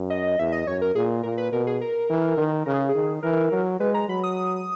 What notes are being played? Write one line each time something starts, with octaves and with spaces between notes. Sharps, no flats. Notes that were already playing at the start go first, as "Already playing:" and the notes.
Already playing: F#2
D#5
E2 E5
D#5
F#2 C#5
A#4
A#2 G#4
A#2 A#4
B4
B2 A#4
G#4
A#4
E3
D#3
C#3 A#4
G#4
G#4
D#3
E3 A#4
F#3
G#3 B4
A#5
F#3 B5
D#6
D#6